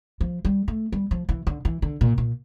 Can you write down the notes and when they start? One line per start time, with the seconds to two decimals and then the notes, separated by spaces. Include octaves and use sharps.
0.21 F3
0.45 G3
0.68 A3
0.92 G3
1.11 F3
1.29 E3
1.47 D3
1.65 E3
1.82 D3
2.01 A#2
2.18 A#2